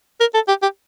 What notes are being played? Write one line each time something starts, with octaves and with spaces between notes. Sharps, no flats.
A#4
A4
G4
G4